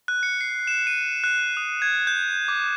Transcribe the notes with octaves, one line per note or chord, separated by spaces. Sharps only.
F#6
C#7
C7
E7
D#7
F#6
D#6
G#6
G6
D6